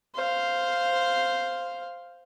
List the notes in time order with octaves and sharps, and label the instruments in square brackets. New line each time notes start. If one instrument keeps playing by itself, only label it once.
[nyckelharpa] C5 F5